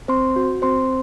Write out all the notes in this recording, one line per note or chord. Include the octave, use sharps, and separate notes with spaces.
C4 C5 C6
F#4
C4 C5 C6